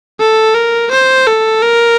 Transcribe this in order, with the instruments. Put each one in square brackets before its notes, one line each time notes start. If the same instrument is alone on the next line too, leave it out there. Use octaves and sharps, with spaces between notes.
[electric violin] A4
A#4
C5
A4
A#4